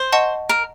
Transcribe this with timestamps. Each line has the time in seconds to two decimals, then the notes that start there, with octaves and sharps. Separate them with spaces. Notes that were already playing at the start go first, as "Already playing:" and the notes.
Already playing: C5
0.12 D#5 F#5 A5 C#6
0.49 A#4